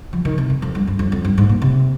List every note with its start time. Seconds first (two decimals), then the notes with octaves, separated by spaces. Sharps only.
0.13 F3
0.25 D#3
0.38 C3
0.50 F2
0.62 F2
0.75 G2
0.88 G2
0.99 F2
1.12 F2
1.25 G2
1.38 G#2
1.49 A#2
1.62 C3